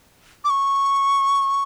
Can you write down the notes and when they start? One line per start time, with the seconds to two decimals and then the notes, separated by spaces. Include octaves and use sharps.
0.45 D6
0.50 C#6